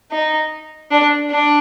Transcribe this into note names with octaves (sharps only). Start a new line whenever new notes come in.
D#4
D4
D4